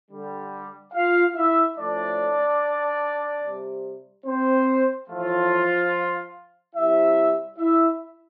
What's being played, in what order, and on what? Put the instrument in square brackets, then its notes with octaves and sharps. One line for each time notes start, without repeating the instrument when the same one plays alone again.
[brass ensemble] D3 G3
F4 F5
E4 E5
A2 F3 A3 D4 D5
C3 G3
C4 C5
A2 E3 F3 A3 F4
C3 G3 E4 E5
E4 E5